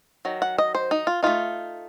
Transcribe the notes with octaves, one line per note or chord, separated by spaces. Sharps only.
D#3 F#3
F#5
D#5
C5
D#4
F4
A3 D#4 F4